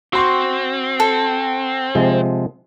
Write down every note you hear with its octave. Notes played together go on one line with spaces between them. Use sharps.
C4 F#4 C6 C#6
A4
C3 F3 G#3